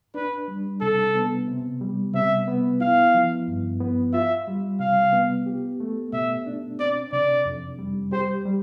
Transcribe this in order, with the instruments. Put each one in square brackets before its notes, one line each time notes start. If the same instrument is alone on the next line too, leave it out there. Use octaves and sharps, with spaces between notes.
[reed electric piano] D4 [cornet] B4
[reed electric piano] G3
[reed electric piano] C3 [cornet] A4
[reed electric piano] B3
C3
G3
[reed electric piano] C3 [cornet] E5
[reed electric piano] B3
[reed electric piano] E4 [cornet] F5
[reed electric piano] F3
G2
B3
[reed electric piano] F4 [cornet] E5
[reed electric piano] G3
[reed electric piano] C3 [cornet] F5
[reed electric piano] B3
G4
A3
[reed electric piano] B2 [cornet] E5
[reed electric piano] D4
[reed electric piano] C4 [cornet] D5
[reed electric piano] C3 [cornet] D5
[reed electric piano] F2
G3
[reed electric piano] G4 [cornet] C5
[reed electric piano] G3